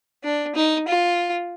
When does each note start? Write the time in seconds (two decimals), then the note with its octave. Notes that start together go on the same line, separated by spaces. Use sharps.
0.24 D4
0.55 D#4
0.88 F4